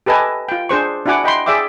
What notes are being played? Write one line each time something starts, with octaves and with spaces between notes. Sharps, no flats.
G4 A4 B4 D#5 G#5 A5
F4 G5
D4 G#4 C5 C#6
D4 E4 F#4 F#5 G#5 D6
D#5 G5 B5 C6
G#4 D5 E5 G5 D6